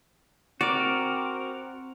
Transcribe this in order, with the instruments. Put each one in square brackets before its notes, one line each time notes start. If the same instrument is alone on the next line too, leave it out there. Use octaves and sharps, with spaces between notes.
[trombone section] C4 [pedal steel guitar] F#4 A#4 [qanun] D5